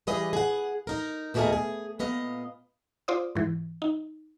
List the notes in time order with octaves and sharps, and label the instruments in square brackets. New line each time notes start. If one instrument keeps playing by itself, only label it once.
[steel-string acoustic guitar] E3 G3 G#4 B4 D#5
G#4 F#5
D#4 A#4
D#2 B2 A3 G4 G#4 A#4
G#4
A#2 B3 D#5 F5
[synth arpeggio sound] F4 C5 D5 D#6
G#2 E3
D#4